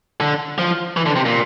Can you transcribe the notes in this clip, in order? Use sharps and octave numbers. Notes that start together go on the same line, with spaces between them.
D3
F3
E3
D3
C3
A#2